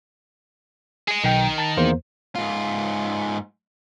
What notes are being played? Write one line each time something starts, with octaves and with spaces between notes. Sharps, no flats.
G#4 D#5
B1 D#3 G5
A5 A6
E2 A#3 C5
G#2 F4